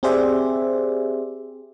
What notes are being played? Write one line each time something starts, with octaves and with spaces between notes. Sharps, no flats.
C4 G4 G#4 C5 D5 E5